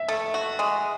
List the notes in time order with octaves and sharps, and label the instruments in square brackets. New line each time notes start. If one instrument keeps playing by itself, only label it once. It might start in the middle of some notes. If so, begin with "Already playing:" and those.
Already playing: [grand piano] E5
[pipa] A3
F#4
G#3